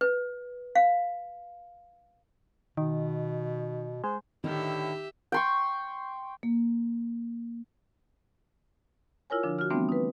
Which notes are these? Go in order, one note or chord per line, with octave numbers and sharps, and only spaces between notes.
B4
F5
B2 D#3
G#3 C5
A2 D3 D#3 G4 E5
G5 C6 C#6
A#3
E4 F4 A#4 C#5 G#5
D3 F3 D4
F#4 F6
E3 G3 A3 B3 C4 D4
D#4 B4